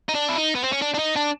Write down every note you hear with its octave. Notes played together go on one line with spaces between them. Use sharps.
D#4
D4
E4
D#4
B3
C4
C#4
D4
D4
D#4
D4